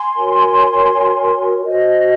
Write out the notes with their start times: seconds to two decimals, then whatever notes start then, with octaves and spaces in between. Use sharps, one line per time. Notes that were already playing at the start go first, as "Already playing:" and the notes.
Already playing: G#5 C6
0.16 F#4 A#4 C#5
1.65 F#4 C5 D#5